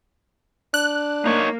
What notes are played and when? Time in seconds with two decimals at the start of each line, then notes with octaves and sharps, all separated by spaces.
0.74 D4 F#6
1.26 A#3 D#4 C#5